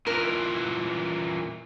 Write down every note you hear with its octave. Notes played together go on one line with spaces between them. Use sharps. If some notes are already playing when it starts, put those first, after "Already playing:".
A#2 E3 A#4